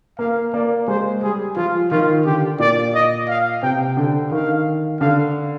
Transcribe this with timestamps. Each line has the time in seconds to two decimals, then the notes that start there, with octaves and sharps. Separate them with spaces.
0.19 A#3 F5
0.54 A#3 D5
0.88 G#3 C5
1.22 G3 G#4
1.56 F3 F4
1.91 D#3 F4
2.26 D3 G4
2.59 A#2 D5
2.94 D#5
3.28 F5
3.63 C3 G5
3.97 D3 G5
4.31 D#3 F5
5.00 D3 F5